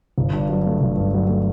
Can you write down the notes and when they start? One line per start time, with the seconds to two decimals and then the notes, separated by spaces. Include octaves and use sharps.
0.18 G1
0.33 G2
0.49 F#3
0.66 A3
0.81 G1
0.97 G2
1.14 F#3
1.29 A3